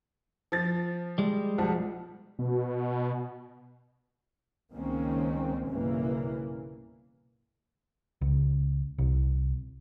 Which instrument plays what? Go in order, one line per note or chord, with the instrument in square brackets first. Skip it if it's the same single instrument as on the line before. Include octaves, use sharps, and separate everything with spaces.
[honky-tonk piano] F3 A6
[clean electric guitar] G3 G#3
[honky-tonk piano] B1 F3 F#5
[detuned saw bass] B2
[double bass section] C#2 D#3 G#3 A#3 C4 C#4
B1 G2 C#3 E3 A#3
[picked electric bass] C#2
C2